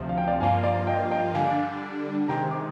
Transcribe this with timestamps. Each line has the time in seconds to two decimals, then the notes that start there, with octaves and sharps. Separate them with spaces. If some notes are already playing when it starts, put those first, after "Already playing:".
Already playing: D2 C3 F3
0.09 F5
0.18 G5
0.28 D5 F5
0.40 G2 F3 A#3 F4 F5 G#5
0.63 D5 F5
0.87 D#5 G5
1.12 D#5 G5
1.34 D3 G3 D4 F5 G#5
2.28 C3 D#3 G#3 G5 A#5
2.51 D6